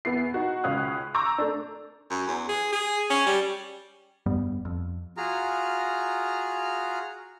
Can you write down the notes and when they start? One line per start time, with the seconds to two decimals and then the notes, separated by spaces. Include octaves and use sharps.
0.05 E2 B3 E4 C7
0.34 D#4 F#4
0.64 C#2 C#4 F5 D#6 F#6
1.14 A#5 C#6 D6 E6 G6
1.38 A3 D4
2.10 F#2
2.27 E2
2.49 G#4
2.72 G#4
3.10 C#4
3.26 G3
4.26 F1 G2 G3 B3
4.65 F2
5.17 F4 F#4 G#4 A#5 F6